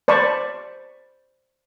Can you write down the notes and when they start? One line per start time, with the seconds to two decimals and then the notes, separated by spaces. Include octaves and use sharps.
0.08 C5 D5 A5 B5 C#6